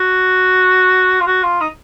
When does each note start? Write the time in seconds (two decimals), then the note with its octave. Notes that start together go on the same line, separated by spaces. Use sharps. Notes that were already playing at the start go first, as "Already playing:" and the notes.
Already playing: F#4
1.20 F4
1.27 F#4
1.43 F4
1.60 D#4